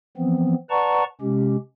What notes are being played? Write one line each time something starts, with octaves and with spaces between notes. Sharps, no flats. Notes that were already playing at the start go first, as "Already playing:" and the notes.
E3 F3 B3 C4
B4 D5 F#5 A5 A#5 C#6
C3 G#3 C#4 G4